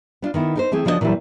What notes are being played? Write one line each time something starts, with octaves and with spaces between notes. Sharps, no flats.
B3 D4 F4
D#3 B3 E4
D#4 A#4 C5
E3 A3 C4 G#4
C#3 F3 D4 E4 F#4 D#5
A#2 E3 F#3 G3 E4